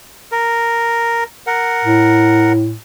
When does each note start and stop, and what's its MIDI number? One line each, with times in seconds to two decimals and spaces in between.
0.32 1.24 70
1.47 2.53 70
1.47 2.53 78
1.84 2.74 45